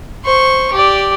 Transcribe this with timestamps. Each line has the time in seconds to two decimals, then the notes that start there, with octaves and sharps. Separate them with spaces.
0.24 C5 C#6
0.73 G4 D5